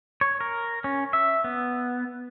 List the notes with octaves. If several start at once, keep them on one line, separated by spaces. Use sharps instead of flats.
C#5
A#4
C#4
E5
B3